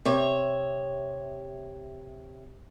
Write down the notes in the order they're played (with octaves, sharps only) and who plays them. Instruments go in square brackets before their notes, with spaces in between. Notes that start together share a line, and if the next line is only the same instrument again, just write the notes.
[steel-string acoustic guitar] C3 C#5 E5